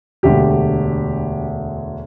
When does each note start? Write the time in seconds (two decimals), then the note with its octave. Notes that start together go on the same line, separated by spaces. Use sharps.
0.23 E1 D2 D3 G4